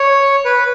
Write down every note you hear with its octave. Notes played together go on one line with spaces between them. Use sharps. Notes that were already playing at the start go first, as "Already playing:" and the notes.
Already playing: C#5
B4